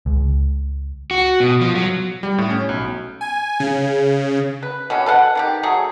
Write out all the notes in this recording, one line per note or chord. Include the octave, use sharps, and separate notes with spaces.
C#2
F#4
B2
F3
F#3
G3
A2
C#4
B1
G#5
C#3
B4
B2 E3 C#4
A4 B4 F5 F#5
D#3 F4 G4
F#3 A3 G#4